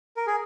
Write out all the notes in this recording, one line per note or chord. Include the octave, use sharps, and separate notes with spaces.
A#4
G#4